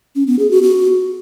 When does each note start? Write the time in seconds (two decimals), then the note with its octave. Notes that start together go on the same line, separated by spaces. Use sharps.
0.16 C#4
0.27 B3
0.39 G#4
0.51 F#4
0.63 F#4